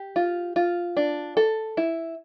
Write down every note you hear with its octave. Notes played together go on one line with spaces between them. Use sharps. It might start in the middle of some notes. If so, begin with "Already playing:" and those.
Already playing: G4
F4
F4
D4
A4
E4